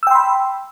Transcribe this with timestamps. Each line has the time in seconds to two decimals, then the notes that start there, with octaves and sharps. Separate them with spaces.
0.03 E6
0.07 G5
0.11 C6
0.15 B5